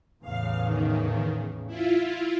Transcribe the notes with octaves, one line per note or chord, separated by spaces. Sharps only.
E2 A2 C#3 F5
D#3
E4 F4